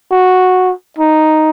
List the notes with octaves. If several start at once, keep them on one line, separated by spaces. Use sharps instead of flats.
F#4
D#4